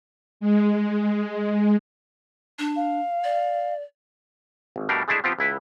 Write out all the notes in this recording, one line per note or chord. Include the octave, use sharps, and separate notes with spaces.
G#3
D4
F5
D5
G#1
B2 G3 A3 D4 A#4
G#3 A3 D4 E4 G#4 E5
F3 B3 C4 F4 G4
C#2 E4 B4